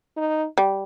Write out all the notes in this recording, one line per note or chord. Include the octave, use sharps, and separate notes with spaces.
D#4
G3